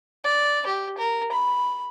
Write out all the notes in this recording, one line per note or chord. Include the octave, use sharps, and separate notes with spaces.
D5
G4
A#4
B5